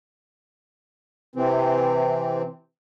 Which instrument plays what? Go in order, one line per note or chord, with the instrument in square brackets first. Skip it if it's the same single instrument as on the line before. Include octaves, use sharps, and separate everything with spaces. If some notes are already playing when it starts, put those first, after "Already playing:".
[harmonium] C3 E3 C4